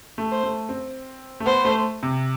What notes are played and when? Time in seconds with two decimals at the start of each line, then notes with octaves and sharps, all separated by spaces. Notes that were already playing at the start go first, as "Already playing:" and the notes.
0.18 A3
0.31 C5
0.43 A3
0.69 C4
1.40 A3
1.46 B3 C5
1.65 A3
2.03 C3